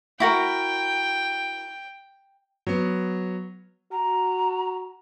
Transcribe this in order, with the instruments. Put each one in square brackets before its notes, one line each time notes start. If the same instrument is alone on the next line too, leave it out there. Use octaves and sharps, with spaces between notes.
[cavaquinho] E4 F#4 A#4 [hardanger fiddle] G5
[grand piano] F#3 B3
[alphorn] F#4 [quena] A#5